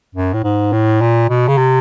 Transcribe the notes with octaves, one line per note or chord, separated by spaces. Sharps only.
F#2
A2
G#2
A2
A#2
B2
C#3
C3